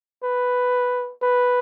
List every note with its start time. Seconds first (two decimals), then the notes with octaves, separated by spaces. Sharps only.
0.23 B4
1.22 B4